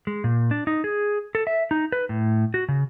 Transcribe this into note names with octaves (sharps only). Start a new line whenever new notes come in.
G#3
A#2
D4
D#4
G#4
A4
E5
D#4
B4
A2
F#4
C#3